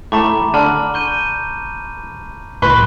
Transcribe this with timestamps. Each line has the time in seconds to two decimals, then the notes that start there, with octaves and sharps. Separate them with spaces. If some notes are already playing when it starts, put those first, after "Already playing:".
0.12 A2 A3 A#5 B5 D6
0.54 D3 A5 F6 F#7
0.94 C#6 G6 D#7
2.62 C2 A2 B4 C6 C#6